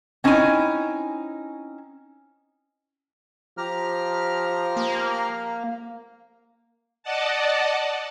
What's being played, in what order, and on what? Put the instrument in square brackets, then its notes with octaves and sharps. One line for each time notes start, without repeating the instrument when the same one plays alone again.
[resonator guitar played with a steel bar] C4 C#4 D#4 E4 G#5
[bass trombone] F3 [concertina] G4 A#5 F6
[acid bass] A#3
[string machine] D5 D#5 F#5 A5